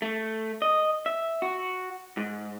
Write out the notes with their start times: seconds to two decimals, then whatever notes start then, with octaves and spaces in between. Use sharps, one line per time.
0.02 A3
0.62 D#5
1.06 E5
1.42 F#4
2.17 G#2